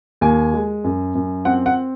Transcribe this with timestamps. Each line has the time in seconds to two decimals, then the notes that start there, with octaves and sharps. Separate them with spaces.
0.21 D#2 G#5
0.54 G#3
0.84 F#2
1.15 F#2
1.45 C4 F#5
1.66 F#5